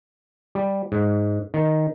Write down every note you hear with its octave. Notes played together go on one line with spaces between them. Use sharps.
G3
G#2
D#3